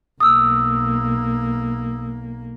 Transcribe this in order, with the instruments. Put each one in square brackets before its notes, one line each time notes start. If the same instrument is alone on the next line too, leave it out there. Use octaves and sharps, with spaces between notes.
[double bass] B1 A#3 [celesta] D#6 E6